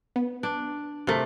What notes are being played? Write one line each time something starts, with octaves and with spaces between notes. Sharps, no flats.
B3
D4
G#1 C3 A3 A#4